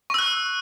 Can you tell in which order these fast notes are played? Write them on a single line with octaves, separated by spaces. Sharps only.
C#6 E6 F#6